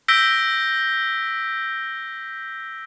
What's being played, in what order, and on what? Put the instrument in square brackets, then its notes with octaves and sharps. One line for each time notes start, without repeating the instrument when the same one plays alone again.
[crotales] E6 G6 A#6 B6 D7 G7